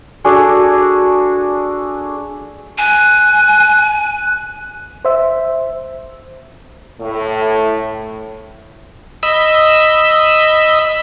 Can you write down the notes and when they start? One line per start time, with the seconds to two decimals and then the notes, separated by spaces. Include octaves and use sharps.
0.24 D4 F#4 G#4 A4
2.78 G#5 F#6
5.05 C5 E5
7.00 A2
9.23 D#5 B5 E6